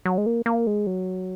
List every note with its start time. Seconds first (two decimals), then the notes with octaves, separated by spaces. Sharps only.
0.06 F#3
0.18 G#3
0.26 A#3
0.46 A#3
0.67 G#3
0.87 F#3